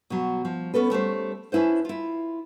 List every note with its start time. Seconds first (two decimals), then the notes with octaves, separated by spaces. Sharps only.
0.10 B2 F#3
0.45 F3
0.74 B3 C#4 A4 B4
0.90 G3 A3 C#4 C5
1.52 C#4 D4 E4 B4 C5
1.85 E4 F4